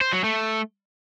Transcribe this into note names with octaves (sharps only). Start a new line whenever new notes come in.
C5
F#3
A3